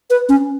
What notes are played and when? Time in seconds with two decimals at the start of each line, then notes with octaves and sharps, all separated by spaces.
0.10 B4
0.29 C#4